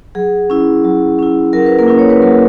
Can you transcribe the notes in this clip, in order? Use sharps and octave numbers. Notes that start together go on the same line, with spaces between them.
F#3 G#4
C#4 E4
F#3
C#4 E4
F#3 A#4
B4
A#3 A#4
C#4 E4
C#5
B4
F#3 A#3 A#4